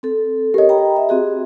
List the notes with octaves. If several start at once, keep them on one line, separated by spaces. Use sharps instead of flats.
C4 A4
G4 A#4 C#5 D#5
G5 A#5 B5
E5
C4 F#4 G#4